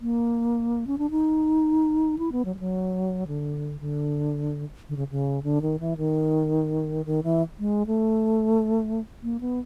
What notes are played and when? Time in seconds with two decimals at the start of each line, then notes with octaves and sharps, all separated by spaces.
0.01 A#3
0.87 C#4
0.98 D4
1.11 D#4
2.18 E4
2.32 B3
2.45 F#3
2.54 G3
2.59 F#3
3.27 D3
3.80 D3
4.89 D3
4.96 C#3
5.11 C#3
5.43 D3
5.62 D#3
5.80 E3
5.97 D#3
7.06 D#3
7.23 E3
7.59 G#3
7.87 A3
9.23 A#3
9.40 B3